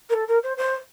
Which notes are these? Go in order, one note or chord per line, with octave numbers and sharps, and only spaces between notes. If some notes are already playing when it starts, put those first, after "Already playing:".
A#4
A4
A#4
C5
C5